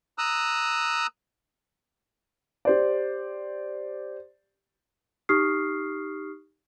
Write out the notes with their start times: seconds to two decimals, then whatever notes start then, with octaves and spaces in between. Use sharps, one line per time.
0.18 A#5 D#6 E6 F#6
2.65 G4 C5 D5
5.29 D#4 G4 C#6 D#6 F6 C7